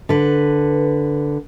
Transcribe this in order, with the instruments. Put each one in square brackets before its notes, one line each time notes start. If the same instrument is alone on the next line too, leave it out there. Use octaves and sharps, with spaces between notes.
[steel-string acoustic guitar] D3 B4